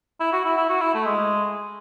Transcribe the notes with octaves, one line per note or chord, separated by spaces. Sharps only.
E4
F#4
E4
E4
F#4
E4
A3
G#3